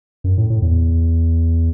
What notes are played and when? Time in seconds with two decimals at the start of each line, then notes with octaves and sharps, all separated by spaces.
0.24 F#2
0.38 A2
0.50 A2
0.62 E2